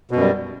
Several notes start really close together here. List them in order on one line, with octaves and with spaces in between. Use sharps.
B2 F#2 G3